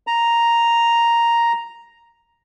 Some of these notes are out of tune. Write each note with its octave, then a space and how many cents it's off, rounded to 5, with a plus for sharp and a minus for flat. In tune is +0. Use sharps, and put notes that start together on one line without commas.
A#5 +0